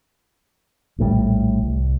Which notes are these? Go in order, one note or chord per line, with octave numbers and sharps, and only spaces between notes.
A#1 A2 C3 G3
C2